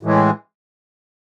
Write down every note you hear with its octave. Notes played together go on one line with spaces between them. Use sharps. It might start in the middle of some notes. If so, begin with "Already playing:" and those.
A2 E3 G#3